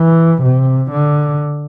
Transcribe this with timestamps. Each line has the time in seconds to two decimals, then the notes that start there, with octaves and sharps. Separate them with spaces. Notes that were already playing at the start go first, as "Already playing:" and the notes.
Already playing: E3
0.43 C3
0.91 D3